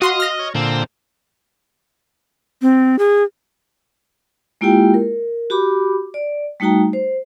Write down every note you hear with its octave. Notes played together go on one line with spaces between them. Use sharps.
F#4 D#5 F5 C6
F6 A#6
C#5
A#2 D3 C4
C4
G#4
G#3 A#3 E4 F4 G4 G5
A#4
F#4 G4 B5 D6
D5
G3 A3 D#4 F#4 G5 A#5
C5